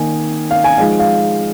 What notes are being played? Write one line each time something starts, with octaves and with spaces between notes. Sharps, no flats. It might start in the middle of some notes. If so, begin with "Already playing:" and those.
Already playing: D#3 A#3 D#4 G#5
F5
G#5
F3 G#3 D#4 F5
F5